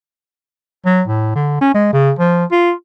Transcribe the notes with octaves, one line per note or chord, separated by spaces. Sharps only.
F#3
A2
D3
C#4
G#3
C#3
F3
F4